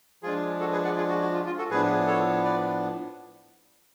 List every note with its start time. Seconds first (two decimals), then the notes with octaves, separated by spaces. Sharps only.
0.23 F3 G#3 D4 F4 G#4
0.60 F#4 A4
0.72 G#4 B4
0.84 D5 F#5
0.97 F4 G#4
1.09 F#4
1.21 F#4
1.33 F4
1.46 F4
1.58 F#4 A4
1.71 A2 F3 B3 D4 G#4 B4
2.07 A4 C#5
2.44 B4 D5